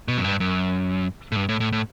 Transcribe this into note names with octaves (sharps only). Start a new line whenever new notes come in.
B2
F#2
G2
F#2
A2
G2
A2
A2
A2